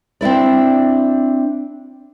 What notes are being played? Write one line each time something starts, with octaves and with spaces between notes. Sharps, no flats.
C4 D4 E4 D5